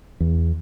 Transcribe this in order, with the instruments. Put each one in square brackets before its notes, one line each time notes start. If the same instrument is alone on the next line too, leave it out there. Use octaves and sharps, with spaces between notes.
[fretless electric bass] E2